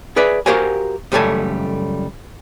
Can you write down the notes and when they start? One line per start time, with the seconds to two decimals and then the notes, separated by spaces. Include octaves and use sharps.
0.16 G#4 B4 D5 E5
0.46 F#4 G4 A#4 C5 F5 G#5
1.12 C#2 F#2 G3 A3 A4 G#5